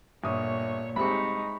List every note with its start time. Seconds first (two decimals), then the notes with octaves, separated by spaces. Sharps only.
0.24 G1 A#2 C#5 D#6
0.96 C2 G#3 C4 D#4 G4 B5 C#6